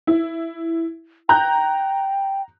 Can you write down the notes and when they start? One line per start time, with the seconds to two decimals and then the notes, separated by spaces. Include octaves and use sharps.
0.07 E4
1.29 G5 A#5 F#6 G6